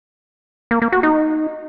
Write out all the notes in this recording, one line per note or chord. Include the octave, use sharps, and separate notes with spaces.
A#3
A#3
F#4
D#4